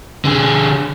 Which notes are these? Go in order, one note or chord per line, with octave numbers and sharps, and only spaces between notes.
D3 G#4